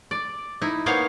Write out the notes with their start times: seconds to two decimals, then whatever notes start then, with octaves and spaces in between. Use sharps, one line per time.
0.11 D5
0.62 D#4 E4
0.86 A#3 B3 D#4 C5 C#5 F5